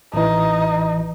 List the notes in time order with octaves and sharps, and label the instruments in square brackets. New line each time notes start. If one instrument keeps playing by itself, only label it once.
[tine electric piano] A1 E3 [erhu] D#4